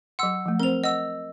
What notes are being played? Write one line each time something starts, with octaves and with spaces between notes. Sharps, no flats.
F#3 F#5 C6 E6
F3 A3
C4 A#4 C5 F7
D#5 F#5 E6